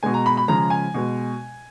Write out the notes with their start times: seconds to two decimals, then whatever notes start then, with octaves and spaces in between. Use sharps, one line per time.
0.03 B2 G#3 G#5
0.14 A#5
0.26 B5
0.37 B5
0.48 C#3 F3 G#3 A#5
0.70 G#5
0.94 B2 G#3